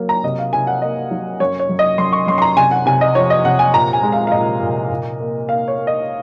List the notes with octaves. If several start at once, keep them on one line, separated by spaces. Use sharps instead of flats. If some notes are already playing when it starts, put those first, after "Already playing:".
Already playing: F#3 A#3
A#5
C3 D#5
F5
C3 G#5
F#5
A#3 D#5
F#3
F#2 C#5
C#5
F#2
D#5
F#2 C6
C#6
F#2 C6
C6
A#5
C3 G#5
F#5
C3 G#5
D#5
F2 C#5
D#5
C3 F#5
G#5
A#2 A#5
G#5
G#3
F5
F5
A#2 D#5
A#2
A#2
A#3
A#3 F5
C#5
A#3
D#5